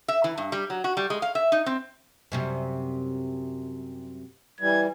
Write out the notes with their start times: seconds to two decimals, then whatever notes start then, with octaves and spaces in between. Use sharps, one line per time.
0.08 E5
0.24 E3
0.38 G2
0.52 G3
0.70 F#3
0.84 F#4
0.97 G3
1.10 G#3
1.22 F5
1.35 E5
1.52 D#4
1.66 C4
2.32 F#2 C3 G3
4.61 E3 G3 G#6